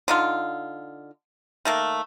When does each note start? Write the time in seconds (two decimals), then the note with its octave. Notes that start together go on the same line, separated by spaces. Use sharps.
0.08 D3 D#4 F4
1.65 D#3 A3 A#3